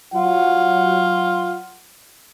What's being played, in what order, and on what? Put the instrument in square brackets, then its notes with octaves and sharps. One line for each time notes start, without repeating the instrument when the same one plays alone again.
[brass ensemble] F#3 F#5 [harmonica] F4